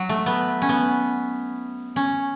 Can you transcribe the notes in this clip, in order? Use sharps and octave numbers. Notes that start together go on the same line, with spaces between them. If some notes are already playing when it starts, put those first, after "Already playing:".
Already playing: F#3
A3
B3
C#4
B3
C#4